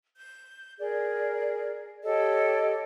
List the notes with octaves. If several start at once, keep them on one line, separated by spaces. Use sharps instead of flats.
G6
G#4 A#4 D5
G4 A4 C#5 D#5